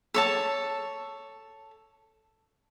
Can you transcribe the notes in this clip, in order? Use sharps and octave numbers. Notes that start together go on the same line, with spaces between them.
A4 C#5 A5